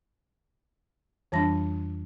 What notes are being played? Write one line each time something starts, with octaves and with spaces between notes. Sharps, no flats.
F2 E3 G3 D4 A5 A#6